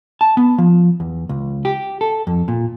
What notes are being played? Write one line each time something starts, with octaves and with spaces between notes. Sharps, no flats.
A5
B3
F3
E2
C#2
G4
A4
F2
A#2